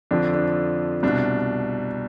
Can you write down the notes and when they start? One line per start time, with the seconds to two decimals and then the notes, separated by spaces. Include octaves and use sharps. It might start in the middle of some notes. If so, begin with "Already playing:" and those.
0.11 F2 D3 F3 D4
0.34 D4
1.03 C2 B2 D4